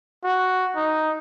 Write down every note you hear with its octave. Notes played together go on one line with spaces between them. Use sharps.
F#4
D#4